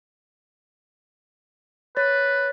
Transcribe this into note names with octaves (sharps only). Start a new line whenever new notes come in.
B4 C#5 A6